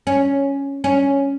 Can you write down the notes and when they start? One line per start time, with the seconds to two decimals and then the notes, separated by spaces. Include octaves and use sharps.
0.07 C#4
0.84 C#4